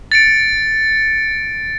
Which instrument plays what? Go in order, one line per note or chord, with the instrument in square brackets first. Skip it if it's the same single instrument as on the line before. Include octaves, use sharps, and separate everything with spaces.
[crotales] A6 C#7 D7